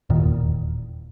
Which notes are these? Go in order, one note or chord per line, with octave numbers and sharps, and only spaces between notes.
E1 D#2 A#2 D#3